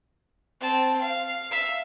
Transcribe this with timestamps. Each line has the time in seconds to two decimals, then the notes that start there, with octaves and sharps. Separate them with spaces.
0.61 C4 A5
1.01 F5
1.51 E5